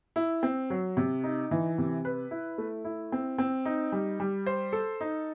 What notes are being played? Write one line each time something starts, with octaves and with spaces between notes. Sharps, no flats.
E4
C4
F#3
C3
D#4
E3
C3
B4
E4
A3
E4
C4
C4
D#4
G3
G3
C5
A4
D#4